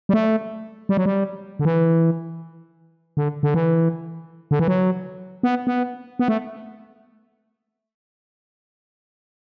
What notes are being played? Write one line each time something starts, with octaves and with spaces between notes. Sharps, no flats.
G3
A3
G3
F#3
G3
D3
E3
D3
D3
E3
D3
E3
F#3
B3
B3
B3
A3